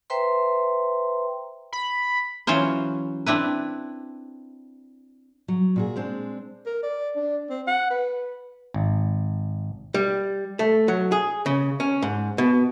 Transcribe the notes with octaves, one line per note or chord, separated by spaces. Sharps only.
B4 C5 E5 G5 A#5 C6
B5
E3 F#3 C#4 F4 C5
C4 D4 E4 B4
F#3
A#2 F#4 G#4
G#3 C4 D4
A#4
D5
D4
C4
F#5
B4
G#1
G3
A3
F#3
G#4
C#3
C#4
G#2
B2